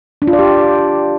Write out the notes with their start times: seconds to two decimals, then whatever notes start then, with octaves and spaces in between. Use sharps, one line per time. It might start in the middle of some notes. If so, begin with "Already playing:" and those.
0.22 D4
0.27 F4
0.33 D5
0.39 G4